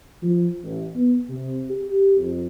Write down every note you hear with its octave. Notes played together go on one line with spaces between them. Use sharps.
F3
A1
B3
C3
G4
F2